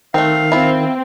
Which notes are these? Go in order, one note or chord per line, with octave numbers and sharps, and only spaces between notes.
D#3 A3 C4 F5
C4 E4 F4